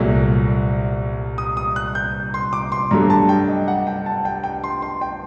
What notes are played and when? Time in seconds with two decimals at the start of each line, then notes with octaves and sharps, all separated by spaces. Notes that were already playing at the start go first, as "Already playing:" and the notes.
Already playing: C2 A#2 F#3 A3 F#6
1.38 D#6
1.57 D#6
1.76 F#6
1.95 G6
2.34 C6
2.53 D6
2.72 C6
2.91 G2 F#3 A3 A#5
3.10 A5
3.29 G5
3.48 D#5
3.68 F#5
3.87 G5
4.06 A5
4.25 G5
4.44 G5
4.64 C6
4.82 C6
5.01 G5